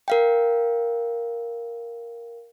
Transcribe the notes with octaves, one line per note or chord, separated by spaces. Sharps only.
A#4 F5 G5